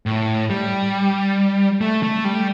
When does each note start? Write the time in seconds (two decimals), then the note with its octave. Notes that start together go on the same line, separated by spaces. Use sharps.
0.06 A2
0.50 G3
1.81 A3
2.03 A3
2.25 G3